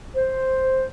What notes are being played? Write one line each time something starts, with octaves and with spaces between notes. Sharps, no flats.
C5